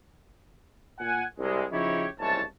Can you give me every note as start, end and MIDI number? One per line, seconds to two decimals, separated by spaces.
1.00 1.25 46
1.00 1.25 78
1.00 1.25 80
1.39 1.65 36
1.39 1.65 56
1.72 2.07 49
1.72 2.07 53
1.72 2.07 63
1.72 2.07 64
1.72 2.07 67
1.72 2.07 73
2.19 2.42 30
2.19 2.42 36
2.19 2.42 44
2.19 2.42 52
2.19 2.42 73
2.19 2.42 81